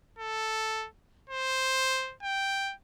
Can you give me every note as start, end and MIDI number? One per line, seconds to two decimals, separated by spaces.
0.19 0.87 69
1.30 2.14 72
2.23 2.73 79